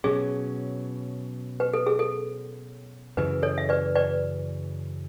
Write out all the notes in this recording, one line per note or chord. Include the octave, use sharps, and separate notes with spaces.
B2 F#3 C#4 G#4
B4
A4
G#4
A4
F#2 C#3 E3 B4
A4 C#5
E5
B4 D5
B4 D5